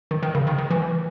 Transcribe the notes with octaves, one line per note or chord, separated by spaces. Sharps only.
D#3
D#3
C#3
D#3
D#3
E3